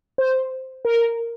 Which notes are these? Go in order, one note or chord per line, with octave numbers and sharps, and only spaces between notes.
C5
A#4